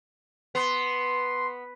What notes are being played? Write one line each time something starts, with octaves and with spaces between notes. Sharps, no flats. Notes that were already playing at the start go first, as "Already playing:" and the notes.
B3 C6